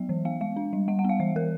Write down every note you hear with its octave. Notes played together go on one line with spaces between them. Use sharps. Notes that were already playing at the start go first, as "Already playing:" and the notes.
Already playing: F#3 B3 E5
E3
B3 F5
G#3 F5
D4
G3
G3 F#5
F#5
B3 F5
E3 E5
E3 A#4